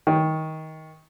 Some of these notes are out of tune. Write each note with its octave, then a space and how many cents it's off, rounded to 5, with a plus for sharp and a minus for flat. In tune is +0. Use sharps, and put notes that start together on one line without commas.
D#3 +20